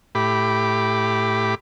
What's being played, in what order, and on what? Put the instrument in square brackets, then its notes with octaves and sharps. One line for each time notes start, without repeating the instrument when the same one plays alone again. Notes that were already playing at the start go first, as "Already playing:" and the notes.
[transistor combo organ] A2 G4 B5 D6